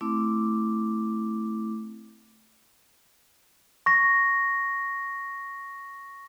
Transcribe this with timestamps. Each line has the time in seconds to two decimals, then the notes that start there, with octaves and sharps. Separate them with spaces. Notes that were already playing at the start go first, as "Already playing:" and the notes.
0.01 A3 C4 E4 D6
3.86 C#6 A#6